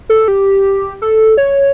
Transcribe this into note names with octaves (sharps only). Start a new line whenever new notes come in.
A4
G4
A4
C#5